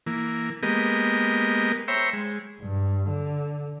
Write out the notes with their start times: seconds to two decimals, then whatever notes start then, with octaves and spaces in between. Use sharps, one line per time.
0.06 E3 A#3
0.63 G#3 A#3 B3 G4 A#4 D#5
1.88 C5 C#5 E5 G5 A#5 B5
2.13 G#3
2.61 G2
3.09 D3